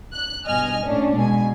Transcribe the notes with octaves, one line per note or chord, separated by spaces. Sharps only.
F#6
G2 B2 D#5 G#5 F6
A2 C#4 D4
B2 G#3 G#5